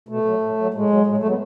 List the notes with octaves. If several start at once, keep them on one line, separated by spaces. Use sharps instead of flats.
B2 A3
F#3
A2
F#3
A2 G#3
F#3
A2 G#3
A3
F#3
B3